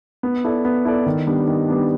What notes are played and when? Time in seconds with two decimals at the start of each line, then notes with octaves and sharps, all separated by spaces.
0.23 B3
0.44 E4 A4 D5
0.65 B3
0.85 E4 A4 D5
1.06 D#3
1.27 G3 B3 D4
1.47 D#3
1.68 G3 B3 D4